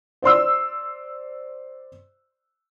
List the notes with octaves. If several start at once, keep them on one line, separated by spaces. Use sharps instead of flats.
C5 D5 C6 E6